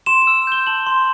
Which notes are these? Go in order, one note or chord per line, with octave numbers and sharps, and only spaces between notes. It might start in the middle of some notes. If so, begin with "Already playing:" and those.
C6 E7
E7
E6
G6 G7
A5 F#7
C6